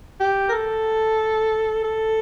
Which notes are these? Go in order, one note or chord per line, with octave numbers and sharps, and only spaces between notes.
G4
A#4
A4
A4